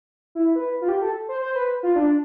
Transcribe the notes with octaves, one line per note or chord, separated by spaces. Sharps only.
E4
B4
F4
G4
A4
C5
C5
B4
F4
D4